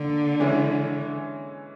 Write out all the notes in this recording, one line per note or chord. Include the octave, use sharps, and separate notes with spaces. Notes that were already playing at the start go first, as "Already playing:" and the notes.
Already playing: D3 A#3
E3 G#3 C#4 E4